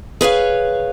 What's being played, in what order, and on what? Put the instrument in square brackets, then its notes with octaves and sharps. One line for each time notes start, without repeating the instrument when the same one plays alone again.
[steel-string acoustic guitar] G#4 B4 C#5 F5